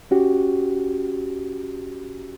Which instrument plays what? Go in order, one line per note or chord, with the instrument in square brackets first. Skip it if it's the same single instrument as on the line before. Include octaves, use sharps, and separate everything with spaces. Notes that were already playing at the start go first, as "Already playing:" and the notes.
[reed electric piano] C#4 F#4 G4